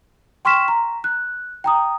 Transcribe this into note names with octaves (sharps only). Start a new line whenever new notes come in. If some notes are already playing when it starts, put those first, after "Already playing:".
G5 C6 C#6 F6 B6 E7
A#5
F#6
G5 A#5 D#6